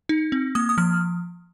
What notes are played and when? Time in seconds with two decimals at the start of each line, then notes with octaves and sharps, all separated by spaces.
0.09 D#4
0.32 C4
0.55 A#3 D#6
0.69 D#6
0.78 F3 F6